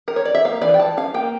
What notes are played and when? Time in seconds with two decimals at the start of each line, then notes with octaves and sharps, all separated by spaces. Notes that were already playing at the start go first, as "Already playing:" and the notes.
0.08 A#4
0.16 C#5
0.25 D5
0.35 E5
0.44 A#3 F5
0.61 E3 D5
0.74 G5
0.80 E3 A5
0.97 C#4 F5
1.14 A#3 G5